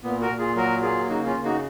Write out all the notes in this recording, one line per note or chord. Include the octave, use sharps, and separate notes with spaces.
A#2 B3
F#4 A#4
A#2
F4 G#4
F#3 F#4 A#4
A#3 F4 G#4
C#3 D#4 F#4
C#4 F4
C#3
D#4 F#4